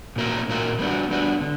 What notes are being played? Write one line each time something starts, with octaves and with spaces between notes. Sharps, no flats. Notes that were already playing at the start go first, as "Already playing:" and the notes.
A#2 A#3 C#4 F#4 A#4
A#2 A#3 C#4 F#4 A#4
G3 B3 D4 F#4
G3 B3 D4 F#4
D3